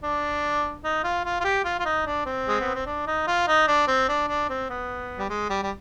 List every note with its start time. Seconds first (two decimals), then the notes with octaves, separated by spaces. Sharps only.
0.03 D4
0.84 D#4
1.04 F4
1.25 F4
1.40 F4
1.44 G4
1.64 F4
1.79 F4
1.85 D#4
2.06 D4
2.26 C4
2.47 G#3
2.60 B3
2.74 C4
2.86 D4
3.07 D#4
3.27 F4
3.48 D#4
3.67 D4
3.87 C4
4.08 D4
4.28 D4
4.49 C4
4.70 B3
5.19 G3
5.30 G#3
5.50 G3
5.63 G3